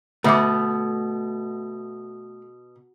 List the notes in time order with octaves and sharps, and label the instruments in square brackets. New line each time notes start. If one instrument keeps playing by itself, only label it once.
[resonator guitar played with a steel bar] B2 [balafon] D3 E5 D6 [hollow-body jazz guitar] A3